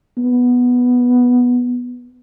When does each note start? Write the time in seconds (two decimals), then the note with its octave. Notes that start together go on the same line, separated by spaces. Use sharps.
0.18 B3